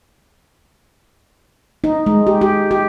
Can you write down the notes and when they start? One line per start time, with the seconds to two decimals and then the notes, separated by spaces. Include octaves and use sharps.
1.84 D#4
2.06 G#3
2.27 G4
2.41 G4
2.71 G4